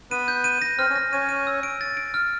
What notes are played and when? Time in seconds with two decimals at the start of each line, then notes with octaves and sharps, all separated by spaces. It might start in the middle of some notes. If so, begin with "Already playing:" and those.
0.11 B3 B4 D#7
0.28 G6
0.44 D#7
0.62 A#6
0.78 C4 C5 F6
0.90 C#4 C#5
0.96 A#6
1.12 C#4 C#5 D#7
1.29 D#7
1.47 E6
1.63 D7
1.81 A6
1.97 D7
2.14 F6